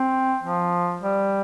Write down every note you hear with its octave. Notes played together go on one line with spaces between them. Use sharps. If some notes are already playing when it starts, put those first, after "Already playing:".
Already playing: C4
F3
G3